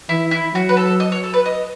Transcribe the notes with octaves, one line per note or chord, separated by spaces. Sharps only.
E3 E4
E4
F#3 F#4
B4
A4
D#5
C#5
A4
B4
D#5